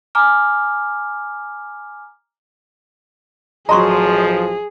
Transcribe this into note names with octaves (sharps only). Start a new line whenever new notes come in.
G#5 A#5 D6 F6
A1 F3 F#3 G#4 D#5 A#5 C6 C#6